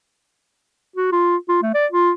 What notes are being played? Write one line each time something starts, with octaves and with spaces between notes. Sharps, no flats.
F#4
F4
F4
A3
D5
F4